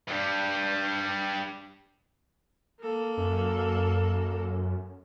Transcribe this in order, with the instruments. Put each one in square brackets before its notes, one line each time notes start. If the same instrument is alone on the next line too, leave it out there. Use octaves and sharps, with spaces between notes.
[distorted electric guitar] G2 G3
[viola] A#3 A4
[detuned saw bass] F#2